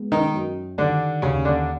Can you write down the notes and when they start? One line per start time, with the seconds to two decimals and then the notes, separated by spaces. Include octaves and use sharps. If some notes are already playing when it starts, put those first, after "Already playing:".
Already playing: G#3 B3
0.12 D#3 D#4
0.34 F#2
0.78 D3 D#3 G3 D4
1.22 D#2 C#3 C#4
1.45 D3 D4